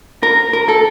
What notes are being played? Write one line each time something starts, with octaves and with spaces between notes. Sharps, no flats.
A#4
A#4
A4